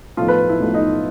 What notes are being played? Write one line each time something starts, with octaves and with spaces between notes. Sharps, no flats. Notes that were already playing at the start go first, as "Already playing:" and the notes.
B1 A2 F3 A3 F4
B4
E4
B1 A2 F3 A3
D#4